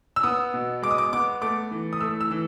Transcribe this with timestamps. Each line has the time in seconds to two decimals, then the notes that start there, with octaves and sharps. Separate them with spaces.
0.16 E6
0.23 B3 D#6
0.54 B2
0.82 G#3 D6
0.91 D#6
0.98 D6
1.13 B3 D6
1.41 A3 D6
1.71 E3
1.93 D#6
2.01 A3 E6
2.21 E6
2.31 E3